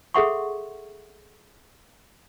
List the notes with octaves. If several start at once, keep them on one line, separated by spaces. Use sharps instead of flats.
G#4 A4 E5 F#5 C6 C#6